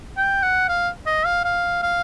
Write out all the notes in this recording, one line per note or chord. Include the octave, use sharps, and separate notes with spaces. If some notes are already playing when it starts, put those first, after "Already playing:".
G5
F#5
F5
D#5
F5
F5
F5